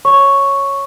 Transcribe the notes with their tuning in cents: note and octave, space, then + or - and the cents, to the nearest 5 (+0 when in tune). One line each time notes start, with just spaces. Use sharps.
C#5 -5 C#6 +0